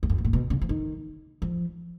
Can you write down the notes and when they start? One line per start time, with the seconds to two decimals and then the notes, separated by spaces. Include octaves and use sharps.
0.03 F2
0.10 F#2
0.18 G#2
0.25 A#2
0.33 B2
0.50 C#3
0.62 F3
0.69 D#3
1.42 F3